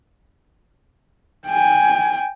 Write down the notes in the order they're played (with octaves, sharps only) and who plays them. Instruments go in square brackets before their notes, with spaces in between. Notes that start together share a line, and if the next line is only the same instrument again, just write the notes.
[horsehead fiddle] G5 G#5